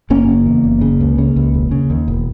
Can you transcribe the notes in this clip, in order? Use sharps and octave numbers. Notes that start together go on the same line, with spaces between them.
F#1 A#3 C#4
C#3
E2
F#1
C#3
C#2
C#3
C#2
E1
C#3
D#2
E1